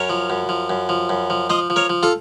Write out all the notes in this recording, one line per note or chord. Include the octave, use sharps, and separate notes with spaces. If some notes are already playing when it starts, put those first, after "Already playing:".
Already playing: F#2 A#4 C#5
F3
F#2
F3
F#2
F3
F#2
F3
F3 C5 D#5
F3
A#4 C#5
F3
F4 A4